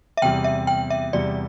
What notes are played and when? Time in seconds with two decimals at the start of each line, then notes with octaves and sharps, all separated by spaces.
0.17 E5
0.22 E2 C3 G3 G5
0.44 E5
0.67 G5
0.90 E5
1.13 E2 C3 G3 D5